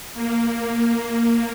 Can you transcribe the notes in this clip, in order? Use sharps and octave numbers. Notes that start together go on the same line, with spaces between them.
A#3
A#3